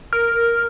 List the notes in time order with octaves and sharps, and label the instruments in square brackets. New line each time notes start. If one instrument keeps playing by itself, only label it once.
[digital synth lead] A#4